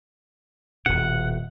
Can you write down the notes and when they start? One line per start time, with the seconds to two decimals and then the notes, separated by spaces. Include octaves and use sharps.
0.86 D#1 B2 F#5